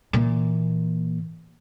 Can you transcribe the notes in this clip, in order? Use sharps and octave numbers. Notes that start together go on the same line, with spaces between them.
A#2 E3